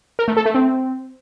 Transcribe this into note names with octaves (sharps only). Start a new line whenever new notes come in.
A#4
A3
A4
A3
C4